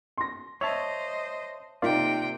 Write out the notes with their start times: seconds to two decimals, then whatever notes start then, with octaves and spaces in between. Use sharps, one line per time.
0.18 C6 A#6
0.61 C5 C#5 D#5 E5 A5 F7
1.82 C3 A#3 D#4 F4 D5 G5